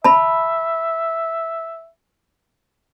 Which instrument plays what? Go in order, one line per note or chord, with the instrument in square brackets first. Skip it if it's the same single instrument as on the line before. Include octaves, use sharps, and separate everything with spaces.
[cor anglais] E5 [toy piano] A5 B5